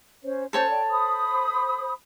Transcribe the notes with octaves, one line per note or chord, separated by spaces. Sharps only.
C#4 C5 C#5
C#4 A4 C5 C#5 A5 G6
D5 G5
C5 B5 D#6